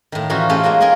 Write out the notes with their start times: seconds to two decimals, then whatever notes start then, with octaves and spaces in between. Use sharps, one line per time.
0.12 A2 D#3
0.30 E3 C#4 D#4 F4 F#4
0.49 A3 C#4 F4 G4 G#4 C5
0.63 G#3 A#3 F4 F#4
0.80 C#4 F4 G#4 A#4 G#5